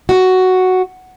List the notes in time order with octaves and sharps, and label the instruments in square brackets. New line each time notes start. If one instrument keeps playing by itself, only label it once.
[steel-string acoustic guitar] F#4